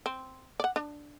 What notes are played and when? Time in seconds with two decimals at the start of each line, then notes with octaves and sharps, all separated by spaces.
0.06 C4
0.60 D5 F#5
0.76 D4